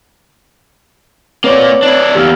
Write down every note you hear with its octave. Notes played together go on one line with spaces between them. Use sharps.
A#3 C4 B4 C#5 D5
D4 E4
E2 A#3 G4 E6 F6